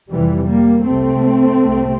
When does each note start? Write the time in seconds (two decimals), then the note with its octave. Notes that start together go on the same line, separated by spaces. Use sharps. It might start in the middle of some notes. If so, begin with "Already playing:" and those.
0.11 F2 C3 E3 G3
0.49 G3 A#3
0.86 C2 C3 A3 C4
1.63 C2 C3